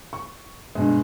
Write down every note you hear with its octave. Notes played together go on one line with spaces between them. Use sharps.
C#6
G2 B2 G#3